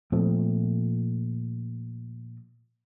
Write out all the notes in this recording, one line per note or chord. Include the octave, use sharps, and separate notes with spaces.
A#2 F3 A3 C4